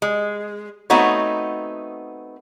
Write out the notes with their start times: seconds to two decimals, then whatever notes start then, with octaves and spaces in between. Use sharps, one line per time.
0.02 G#3
0.90 A3 B3 C4 D#4 F#4 C#5